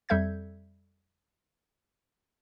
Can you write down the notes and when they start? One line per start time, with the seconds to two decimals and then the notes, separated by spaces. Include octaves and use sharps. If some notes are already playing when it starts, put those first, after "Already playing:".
0.09 F2 G3 A4 E5 G6 G#6